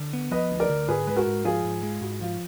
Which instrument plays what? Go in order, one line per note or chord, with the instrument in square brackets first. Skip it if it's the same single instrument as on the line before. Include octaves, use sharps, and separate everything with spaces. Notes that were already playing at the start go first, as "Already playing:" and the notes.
Already playing: [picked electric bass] D3
B3
[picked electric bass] F3 [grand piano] B4 D#5
[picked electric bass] D2
[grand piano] A#4 D5
[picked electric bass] D3
[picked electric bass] G#2 [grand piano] G#4 B4
[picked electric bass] G#3 [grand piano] B4
[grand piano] F#4 A#4
[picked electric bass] G#2
[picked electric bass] F3 [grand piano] F4 G#4
[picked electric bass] G#2
G#3
[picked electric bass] G#2 [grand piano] F#4
[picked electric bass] F3 [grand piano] F4